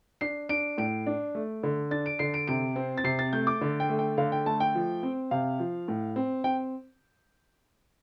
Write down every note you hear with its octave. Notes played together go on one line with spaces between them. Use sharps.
D4 C7
D4 D7
A2 D7
D4
A3
D3
D4 A6
D7
D3 C7
D7
C3 D7
C4
A6
C3 C7
A6
A3 G6
D6
D3
G5
A3
G5
D3 F5
G5
A3 A5
G5
F3
C4
C3 F5
F3
A2
C4
C4 G5